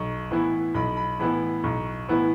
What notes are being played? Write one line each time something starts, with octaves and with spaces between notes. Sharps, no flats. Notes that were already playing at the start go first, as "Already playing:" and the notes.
Already playing: B1 C#6
A2 E3 B3 E4
B1 B5
B5
A2 E3 B3 E4 B5
B1 C#6
A2 E3 B3 E4